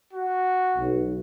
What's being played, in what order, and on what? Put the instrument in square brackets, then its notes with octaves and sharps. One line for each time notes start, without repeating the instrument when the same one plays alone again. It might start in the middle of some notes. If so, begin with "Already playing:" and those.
[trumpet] F#4
[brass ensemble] B1